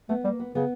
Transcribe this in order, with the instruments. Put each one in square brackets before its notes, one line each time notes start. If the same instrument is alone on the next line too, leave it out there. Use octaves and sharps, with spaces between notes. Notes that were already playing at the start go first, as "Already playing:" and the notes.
[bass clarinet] A3 [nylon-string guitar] B3
[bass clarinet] G3 [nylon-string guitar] A#3
[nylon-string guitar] B3
[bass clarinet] C#3 [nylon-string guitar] B3